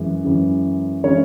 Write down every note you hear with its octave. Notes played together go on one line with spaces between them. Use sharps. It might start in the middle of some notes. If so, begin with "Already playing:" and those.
Already playing: F#2 E3 G#3 C#4
F#2 E3 G#3 C#4
E3 G#3 C#4 C#5